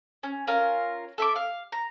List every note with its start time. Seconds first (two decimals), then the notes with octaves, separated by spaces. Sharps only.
0.23 C#4
0.47 C#4 F4 A#4
1.18 A4 E5 C6 D6
1.36 F5
1.72 A#5